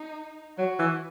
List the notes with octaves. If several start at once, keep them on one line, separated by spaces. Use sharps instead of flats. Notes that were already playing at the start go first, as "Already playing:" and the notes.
Already playing: D#4
F#3 F#4
E3